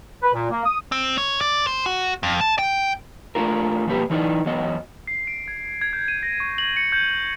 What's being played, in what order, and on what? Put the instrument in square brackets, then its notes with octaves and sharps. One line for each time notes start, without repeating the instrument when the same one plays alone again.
[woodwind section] B4
A#2
A#3
D#6
[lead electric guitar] C4
C#5
D5
C5
F#4
F2
A5
G5
[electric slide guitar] A3 D4 F4 A#4
B2 F3 G3 A#3 G4 B4
E3 F#3 D#4 E4 D5 D#5
E2 F#3 B3 D#5
[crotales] C7
D7
G#6
G#6
G6
D#7
A#6
C#6
F#7
C#7
G6